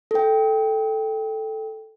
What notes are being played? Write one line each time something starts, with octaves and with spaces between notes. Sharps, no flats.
A4 G5